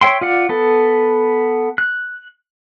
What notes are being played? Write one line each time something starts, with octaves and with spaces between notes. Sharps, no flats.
C#5 E5 G5 C6
F4 D5 F#5
B3 A4
F#6